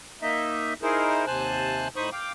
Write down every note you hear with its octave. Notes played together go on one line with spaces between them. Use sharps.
A#3 D#4 D#5 E5
D#4 E4 G#4 A#4 C5
D#2 C3 C5 G#5 A5 F#6
A2 D#4 C5 B5 C#6 D#6
F5 G5 D6